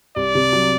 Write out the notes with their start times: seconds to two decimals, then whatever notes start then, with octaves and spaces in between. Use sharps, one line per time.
0.16 C2 D5
0.35 C3
0.53 F#3